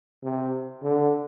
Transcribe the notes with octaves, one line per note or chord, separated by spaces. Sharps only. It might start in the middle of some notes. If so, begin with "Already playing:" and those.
C3
D3